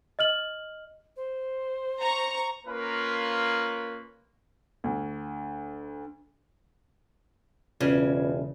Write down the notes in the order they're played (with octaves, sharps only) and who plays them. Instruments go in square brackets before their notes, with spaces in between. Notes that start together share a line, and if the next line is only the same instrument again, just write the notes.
[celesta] D#5 F6 F#7
[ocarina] C5
[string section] A#5 C#6
[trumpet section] A#3 C#4 F4 A#4 B4
[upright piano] D2
[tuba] E1 [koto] C#3 [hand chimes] F4 B4 D5